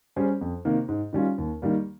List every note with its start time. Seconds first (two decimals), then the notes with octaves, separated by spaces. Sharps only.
0.16 G3 C#4 G#4 C5
0.41 F2
0.65 C3 D#3 A#3
0.88 G#2
1.13 D#3 G3 C#4 F4
1.38 D#2
1.62 D#3 G3 A#3